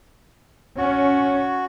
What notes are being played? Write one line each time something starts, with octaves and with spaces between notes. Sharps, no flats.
C#4 F#4